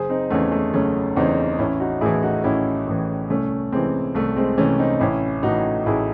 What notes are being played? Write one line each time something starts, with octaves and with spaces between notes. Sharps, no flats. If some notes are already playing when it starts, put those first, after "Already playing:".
Already playing: F#1 G#4 C5
C4 D#4
E2 C#3 E3 A3 C#4
A3
F#1 A3 C#4
E2 C#3 E3 C4 D#4
A1 C#4 E4
D#4 F#4
A2 E3 E4 G#4
D#4 F#4
A1 C#4 E4
A2 E3
C2 A3 C#4
C3 E3 G#3 C4
C2 A3
G#3 C4
C3 E3 A3 C#4
C4 D#4
A1 C#4 E4
A2 E3 D#4 F#4
A1 E4 G#4